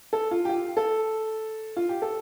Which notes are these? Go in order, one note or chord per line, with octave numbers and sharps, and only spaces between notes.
A4
F4
G4
F4
A4
F4
G4
A4